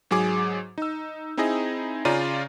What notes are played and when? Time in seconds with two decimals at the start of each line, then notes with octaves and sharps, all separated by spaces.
0.11 G#2 F#3 G#4 D6
0.78 D#4 E6
1.37 C4 D#4 E4 G#4 D#5
2.05 C#3 C#4 F4 D5 A#5 D#7